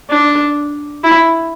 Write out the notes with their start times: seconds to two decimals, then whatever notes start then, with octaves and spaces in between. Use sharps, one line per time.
0.10 D4
1.04 E4